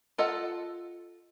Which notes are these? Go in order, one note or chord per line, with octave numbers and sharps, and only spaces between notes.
F4 A4 D#5 F#5